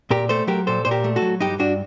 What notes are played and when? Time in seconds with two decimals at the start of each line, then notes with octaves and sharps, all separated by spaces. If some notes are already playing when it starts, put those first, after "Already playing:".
0.10 A#2 G4 A#4
0.29 A3 A4 C5
0.47 F#3 G4 A#4
0.67 A#2 A4 C5
0.85 A#2 C5
0.91 G4 A#4
1.04 A3
1.16 F#4 A4
1.22 F#3
1.41 G2 D#4 G4
1.60 G2 D4 F#4